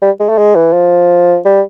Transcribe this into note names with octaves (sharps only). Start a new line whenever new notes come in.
G3
G#3
A3
G#3
E3
F3
G3